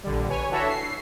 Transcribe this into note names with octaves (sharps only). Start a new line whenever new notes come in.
A#1 D3 G3
B4 C#5 G#5
D4 E4 F#4 A4 C#5 E5
C7